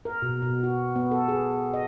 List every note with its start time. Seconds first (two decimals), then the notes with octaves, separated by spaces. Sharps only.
0.05 A#4
0.22 B2
0.42 B2
0.63 F#4
0.96 B3
1.11 A4
1.28 G#4
1.74 D#5